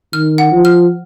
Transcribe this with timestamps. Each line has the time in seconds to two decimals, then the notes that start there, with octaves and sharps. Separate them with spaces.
0.13 D#3 F6
0.38 F#5
0.52 F3
0.65 F6